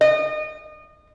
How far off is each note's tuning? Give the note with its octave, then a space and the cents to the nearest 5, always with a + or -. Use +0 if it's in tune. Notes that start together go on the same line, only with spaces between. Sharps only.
D#5 -30